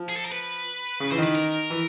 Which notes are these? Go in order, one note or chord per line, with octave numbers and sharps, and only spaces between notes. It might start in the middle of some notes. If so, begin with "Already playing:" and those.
Already playing: F3
G#4
A4
A#4
B4
C#3
E3 C5
D#3
B4
A#4
E3